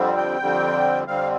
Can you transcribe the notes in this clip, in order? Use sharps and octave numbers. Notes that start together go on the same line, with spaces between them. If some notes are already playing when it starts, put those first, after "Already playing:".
Already playing: F2 D3 G3 C4
G5
F2 D3 G3 C4
F2 D3 G3 C4 F5